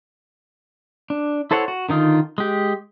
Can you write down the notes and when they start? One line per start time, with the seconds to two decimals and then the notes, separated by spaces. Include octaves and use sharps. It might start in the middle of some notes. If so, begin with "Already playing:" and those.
1.10 D4
1.51 E4 A4 C5 C#5 F#5
1.68 F#4
1.89 D3 D#3 D#4 F4
2.38 G#3 G4